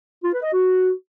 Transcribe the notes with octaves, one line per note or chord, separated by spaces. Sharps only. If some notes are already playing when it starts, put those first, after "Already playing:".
F4
B4
D#5
F#4